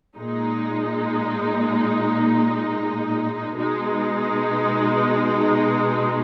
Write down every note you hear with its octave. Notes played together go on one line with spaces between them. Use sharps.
A#2 G#3 D#4
B2 G#3 D#4